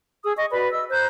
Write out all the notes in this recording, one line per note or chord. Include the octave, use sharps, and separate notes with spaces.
G#4 D#6 E6
D#5 C#6
F#4 B4 D5 B5
D#5 E6
C5 A#5 F#6 G6